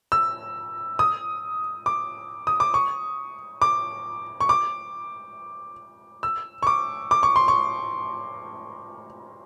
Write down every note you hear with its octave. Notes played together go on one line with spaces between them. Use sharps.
E6
D#6
D6
D#6
D6
C#6
D6
C#6
D6
E6
C#6
D6
D6
C#6
C6
C#6